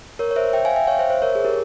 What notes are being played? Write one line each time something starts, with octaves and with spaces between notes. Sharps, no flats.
A#4 C#5
C#5
C5 E5
E5 G5
F5 G#5
E5 G5
C#5 F5
C5 E5
C5 E5
A#4 C#5
G#4
G4 A#4